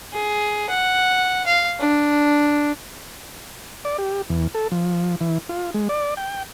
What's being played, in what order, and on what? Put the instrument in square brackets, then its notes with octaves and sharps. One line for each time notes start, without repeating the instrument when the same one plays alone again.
[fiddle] G#4
F#5
F5
D4
[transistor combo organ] D5
G4
E2
A4
F3
E3
F4
G#3
D5
G5